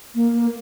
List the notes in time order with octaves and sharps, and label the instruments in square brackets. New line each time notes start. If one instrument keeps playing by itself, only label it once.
[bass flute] A#3